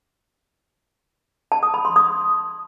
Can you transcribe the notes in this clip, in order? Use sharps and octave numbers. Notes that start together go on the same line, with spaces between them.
A5
D#6
B5
C6
D#6